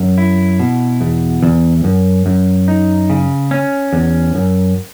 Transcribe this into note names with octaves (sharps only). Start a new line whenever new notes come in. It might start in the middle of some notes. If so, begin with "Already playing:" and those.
Already playing: F#2
E4
B2
E2
E2
F#2
F#2
D#4
C#3
C#4
E2
F#2